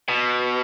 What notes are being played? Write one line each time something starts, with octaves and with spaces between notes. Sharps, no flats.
B2